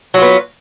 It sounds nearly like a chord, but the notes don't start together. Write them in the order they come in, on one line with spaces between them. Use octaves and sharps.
F#3 F4 B3